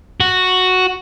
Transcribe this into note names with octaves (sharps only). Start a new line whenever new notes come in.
F#4